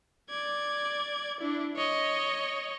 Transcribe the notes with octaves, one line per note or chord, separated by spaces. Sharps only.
D5 G#6
D4 E4
C#5 D#5